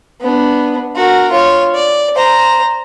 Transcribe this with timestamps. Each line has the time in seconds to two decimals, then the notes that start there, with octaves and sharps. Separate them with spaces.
0.21 B3 D4
0.96 F#4 A#4
1.31 F4 C#5
1.74 D5
2.15 C5 A#5